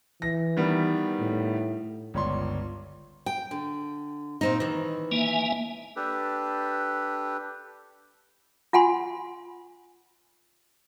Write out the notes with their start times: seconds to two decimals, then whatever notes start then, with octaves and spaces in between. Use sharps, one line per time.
0.22 E3 A#6
0.57 D#3 G3 B3
1.20 A2
2.14 G1 C#2 C#5 D5 C6
3.26 G5
3.51 D3
4.41 A#2 C4 D#4
4.60 D#3 E3
5.11 A#3 E5 G#5
5.96 D4 G4 A4 B4
8.73 F4 F#5 G#5 B5 C6